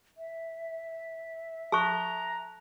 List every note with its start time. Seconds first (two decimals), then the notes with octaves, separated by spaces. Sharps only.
0.18 E5
1.72 A4 A5 A#5 C#6 F#6